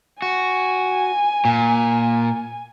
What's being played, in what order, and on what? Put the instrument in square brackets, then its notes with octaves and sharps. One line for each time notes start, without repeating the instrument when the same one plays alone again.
[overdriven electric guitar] F#4 [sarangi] G#5
[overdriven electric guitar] A#2